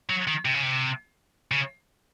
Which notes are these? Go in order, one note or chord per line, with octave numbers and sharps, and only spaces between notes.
F#3
D#3
C3
C#3
C3
C#3